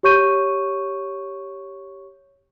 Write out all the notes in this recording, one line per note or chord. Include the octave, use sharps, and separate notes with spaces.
G4 C#5 C#6 G6 D#7